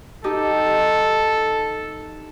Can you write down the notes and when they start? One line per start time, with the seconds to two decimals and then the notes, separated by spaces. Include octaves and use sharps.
0.24 D#4 G4 A4